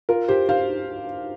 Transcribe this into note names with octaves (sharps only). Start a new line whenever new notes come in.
F4 A#4
G4 C5
C5 F5